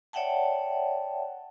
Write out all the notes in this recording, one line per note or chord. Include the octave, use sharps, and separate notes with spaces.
C#5 D5 E5 F#5 G5 A5